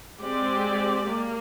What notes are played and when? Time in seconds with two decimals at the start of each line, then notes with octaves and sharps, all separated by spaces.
0.21 G#3 C4 G4 D5
1.11 A#3